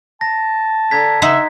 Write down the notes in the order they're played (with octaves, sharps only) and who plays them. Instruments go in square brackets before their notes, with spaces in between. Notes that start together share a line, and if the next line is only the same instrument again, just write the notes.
[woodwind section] A5 [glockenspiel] A#6
[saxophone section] D3 [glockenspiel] A#5 G#6 B6
[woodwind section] C#3 [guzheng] D#4 C5 F#5 [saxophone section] E5 [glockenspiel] B6